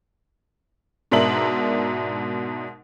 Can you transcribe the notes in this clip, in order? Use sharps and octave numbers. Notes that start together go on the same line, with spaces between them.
G#2 B2 D4 A#4 E5 F#7